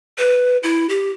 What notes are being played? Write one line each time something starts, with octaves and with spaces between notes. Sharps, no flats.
B4
E4
G4